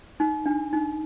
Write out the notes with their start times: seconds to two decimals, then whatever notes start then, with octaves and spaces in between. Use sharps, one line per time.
0.20 D#4
0.46 D4
0.73 D#4